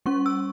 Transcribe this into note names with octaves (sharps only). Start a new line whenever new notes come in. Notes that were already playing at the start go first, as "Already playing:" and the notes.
G3 C#4 C#6
E6